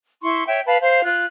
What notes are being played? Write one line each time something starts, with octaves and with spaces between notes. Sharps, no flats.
E4 C6 C#6
C#5 E5 G5
B4 F5 A5 B5
C5 F5
F4 F#6